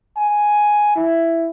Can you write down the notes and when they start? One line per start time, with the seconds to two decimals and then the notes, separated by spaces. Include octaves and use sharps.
0.17 G#5
0.96 E4